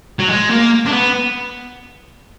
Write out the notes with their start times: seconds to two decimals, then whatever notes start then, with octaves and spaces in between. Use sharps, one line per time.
0.19 F#3
0.29 G#3
0.50 A#3
0.86 D4
0.91 B3